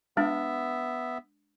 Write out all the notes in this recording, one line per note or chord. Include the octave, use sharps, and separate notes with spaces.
G#3 B3 D4 E5